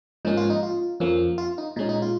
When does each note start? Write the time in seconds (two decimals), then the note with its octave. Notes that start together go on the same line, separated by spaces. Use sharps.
0.25 G#2 F3 A#3 C#4 D#4
0.37 F4
0.50 D#4
0.63 F4
1.00 F2 F3 A#3 C#4
1.38 F4
1.58 D#4
1.76 A#2 G#3 C#4 D#4
1.89 D#4
2.02 F4